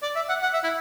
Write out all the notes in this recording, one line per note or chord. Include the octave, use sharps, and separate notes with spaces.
D5
E5
F#5
F#5
E5
E4